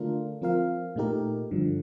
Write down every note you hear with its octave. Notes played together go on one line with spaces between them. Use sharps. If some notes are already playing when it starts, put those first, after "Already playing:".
Already playing: D3 A3 D4 F4 A#4
F3 C4 F4 A#4 F5
A#2 A3 D#4 G4 A#4
G2 D3 F3